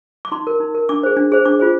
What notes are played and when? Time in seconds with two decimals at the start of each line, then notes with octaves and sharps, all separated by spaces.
0.25 D6
0.32 D#4 C6
0.47 A#4
0.60 D#4
0.75 A#4
0.89 D4 D6
1.03 G#4 C5
1.17 D4
1.32 G#4 C5
1.45 D4 D6
1.60 F4 G#4 C5